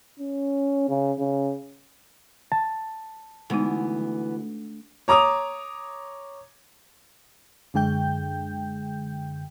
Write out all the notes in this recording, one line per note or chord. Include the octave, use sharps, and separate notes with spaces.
C#4
C#3
C#3
A5
D2 E3 G#3 B3 D#4
C#5 A#5 D6 D#6 F7
F#2 D3 G#3 G5 G6